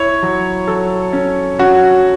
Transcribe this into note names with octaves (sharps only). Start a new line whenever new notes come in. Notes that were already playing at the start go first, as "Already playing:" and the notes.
Already playing: E4 C#5
F#3
F#3 A4
C#4
C#4 F#4